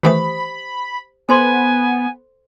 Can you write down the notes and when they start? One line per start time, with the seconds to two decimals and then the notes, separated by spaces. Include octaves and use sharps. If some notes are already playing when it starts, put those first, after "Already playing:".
0.03 D#3 E3 A3 G4 C5 B5 D#6
1.29 B3 A4 C5 G#5 C6